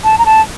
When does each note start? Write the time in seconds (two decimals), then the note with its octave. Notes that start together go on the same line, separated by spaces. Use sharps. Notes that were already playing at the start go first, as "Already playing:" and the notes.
0.04 A5
0.18 A#5
0.26 A5